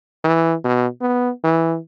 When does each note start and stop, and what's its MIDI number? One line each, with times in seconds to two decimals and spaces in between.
0.24 0.54 52
0.64 0.87 47
1.01 1.30 59
1.44 1.77 52